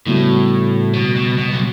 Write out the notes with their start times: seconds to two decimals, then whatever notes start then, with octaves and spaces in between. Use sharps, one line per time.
0.06 A2 C#3 G3 B3 F#4
0.93 B2
1.16 B2
1.38 B2
1.52 F#3